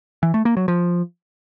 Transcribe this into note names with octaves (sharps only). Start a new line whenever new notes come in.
E3
A3
A#3
F#3
F3